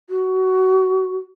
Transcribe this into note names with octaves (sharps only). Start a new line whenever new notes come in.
F#4